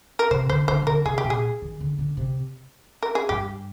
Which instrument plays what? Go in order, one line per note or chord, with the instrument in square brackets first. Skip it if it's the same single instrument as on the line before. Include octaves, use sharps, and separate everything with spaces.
[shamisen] A#4
[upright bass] C3 [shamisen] C5
[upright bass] D3 [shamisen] C5
[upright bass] D3 [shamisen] C5
[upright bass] C3
[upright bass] D3 [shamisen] A#4
[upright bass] C3 [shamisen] G#4
[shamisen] G4
[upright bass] A#2
[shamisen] G#4
[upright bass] D#3
D3
D3
C3
[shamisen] A#4
G#4
[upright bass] G2 [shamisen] G4